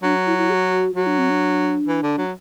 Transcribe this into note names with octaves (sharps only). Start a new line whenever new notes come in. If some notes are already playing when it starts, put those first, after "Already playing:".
F#3 D4
E4
E4
G#4
F#4
F#3 F#4
D4
C4
D4
E3
D3
F#3